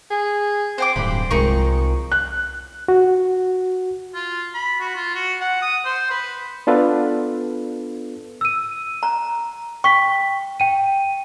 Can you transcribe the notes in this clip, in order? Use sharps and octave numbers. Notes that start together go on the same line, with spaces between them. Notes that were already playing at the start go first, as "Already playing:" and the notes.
G#4
C4 C5 G5 D6
D1 G2 D3 D#3 B5
C2 F3 G#3 D#4 A#4 C#6
F#6
F#4
F4
B5
F#4
F4
F#4
F#5
D#6
C5
B4
B3 D4 F4 A4 B4
E6 D#7
A#5
G5 C#6 B6
G5 D#7